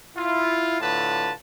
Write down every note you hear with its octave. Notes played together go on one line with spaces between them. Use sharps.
E4 F4
A2 D3 F4 B4 A5